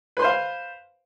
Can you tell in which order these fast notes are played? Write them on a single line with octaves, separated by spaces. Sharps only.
B4 C6 C5 F5